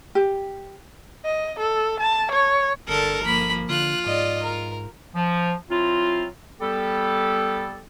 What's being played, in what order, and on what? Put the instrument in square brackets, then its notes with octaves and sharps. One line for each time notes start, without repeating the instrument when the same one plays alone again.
[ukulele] G4
[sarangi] D#5
A4
A5
C#5
[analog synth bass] G1 [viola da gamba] D3 A4 A#4
[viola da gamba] F3 A#3 [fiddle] A#4 B5
[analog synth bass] D3 [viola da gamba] F4 [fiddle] F#6
[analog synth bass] G#2 [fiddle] D5 D#5
[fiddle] A#4
[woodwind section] F3
F#3 C4 E4 F4
G3 B3 G4 A4